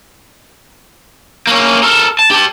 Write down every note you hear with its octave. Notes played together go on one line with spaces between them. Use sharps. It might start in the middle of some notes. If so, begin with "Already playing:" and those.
A#3 C#4
A4 A#4
A5
G4 A5